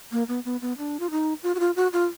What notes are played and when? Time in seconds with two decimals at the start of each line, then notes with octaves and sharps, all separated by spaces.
0.12 A#3
0.28 B3
0.45 B3
0.62 B3
0.78 D4
1.00 F4
1.11 D#4
1.43 F4
1.55 F#4
1.60 F4
1.76 F#4
1.93 F4